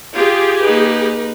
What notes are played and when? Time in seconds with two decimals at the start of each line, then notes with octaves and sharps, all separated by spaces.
0.16 F4 G4 G#4
0.62 A#3 D#4 B4